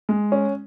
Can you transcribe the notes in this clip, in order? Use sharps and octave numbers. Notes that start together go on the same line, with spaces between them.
G#3
C#4